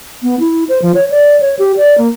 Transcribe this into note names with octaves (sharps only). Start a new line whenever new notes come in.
B3
E4
C5
F3
C#5
D5
C#5
G4
D5
A#3